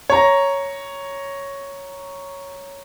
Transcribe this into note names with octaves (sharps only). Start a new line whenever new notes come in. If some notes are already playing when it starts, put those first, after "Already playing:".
C#5 A#5